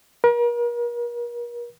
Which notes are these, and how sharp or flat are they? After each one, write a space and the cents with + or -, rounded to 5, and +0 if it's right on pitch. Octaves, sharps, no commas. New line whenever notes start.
A#4 +40